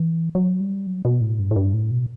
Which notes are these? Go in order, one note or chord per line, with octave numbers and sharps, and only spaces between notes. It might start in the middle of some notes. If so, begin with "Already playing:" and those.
Already playing: E3
F#3
G3
F#3
B2
A2
G2
A2
G2
A2
B2